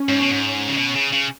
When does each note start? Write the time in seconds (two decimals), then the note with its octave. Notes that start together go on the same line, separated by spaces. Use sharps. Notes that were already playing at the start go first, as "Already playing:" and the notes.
Already playing: C#4
0.09 G#2
0.20 B2
0.30 G#2
0.68 C#3
0.77 B2
0.95 C#3
1.12 C#3